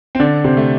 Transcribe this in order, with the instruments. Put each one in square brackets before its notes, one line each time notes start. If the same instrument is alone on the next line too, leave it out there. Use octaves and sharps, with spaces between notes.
[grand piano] C4
D3 D4
C3 C4
A3